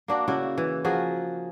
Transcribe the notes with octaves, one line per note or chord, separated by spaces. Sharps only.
A#3 D4 F#4
C#3 E4 F#4
E3
F3 F#4 G#4 A#4